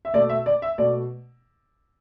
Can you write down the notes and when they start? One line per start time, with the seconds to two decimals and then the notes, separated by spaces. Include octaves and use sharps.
0.05 E5
0.13 B2 A3 D5
0.29 E5
0.46 D5
0.62 E5
0.78 B2 A3 D5